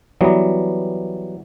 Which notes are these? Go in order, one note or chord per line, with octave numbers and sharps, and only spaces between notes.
E3 F#3 G3 B3